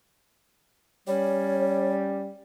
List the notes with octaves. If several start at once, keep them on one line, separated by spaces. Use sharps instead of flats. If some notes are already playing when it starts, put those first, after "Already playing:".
G3 C#4 C#5